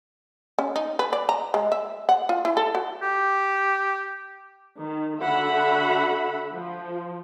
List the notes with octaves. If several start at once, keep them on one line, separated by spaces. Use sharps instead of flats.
C#4
D#4
B4
D5
A#5
G#3
E5
F#5
F4
E4
A4
F#4
G4
D#3
D3 F#4 E5 F#5 B5
F3